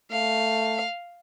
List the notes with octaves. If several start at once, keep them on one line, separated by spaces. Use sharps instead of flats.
A3 F5